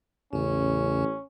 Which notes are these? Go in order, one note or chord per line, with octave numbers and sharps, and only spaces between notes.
A1 E2 C#3 C#4